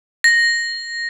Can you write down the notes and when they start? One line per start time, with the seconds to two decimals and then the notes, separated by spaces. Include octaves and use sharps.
0.24 A#6